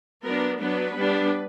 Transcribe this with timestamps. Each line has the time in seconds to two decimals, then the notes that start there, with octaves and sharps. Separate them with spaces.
0.24 F#3 B3 D4 A#4
0.60 F#3 B3 D4 B4
0.96 G3 B3 D4